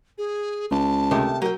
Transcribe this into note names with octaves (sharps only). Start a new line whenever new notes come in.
G#4
C#2 A5
C3 D#3 A3
F#3 A#4 G5